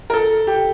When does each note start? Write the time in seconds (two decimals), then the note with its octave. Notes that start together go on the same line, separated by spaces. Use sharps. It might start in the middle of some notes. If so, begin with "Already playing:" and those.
0.10 A#4
0.13 A4
0.47 G4